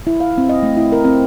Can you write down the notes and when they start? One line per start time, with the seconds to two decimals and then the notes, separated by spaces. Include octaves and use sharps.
0.07 E4
0.20 F5
0.38 C4
0.49 D#5
0.63 A3
0.77 E4
0.92 A#4
1.05 C4